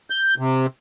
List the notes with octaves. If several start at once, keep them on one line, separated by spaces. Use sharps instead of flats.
G6
C3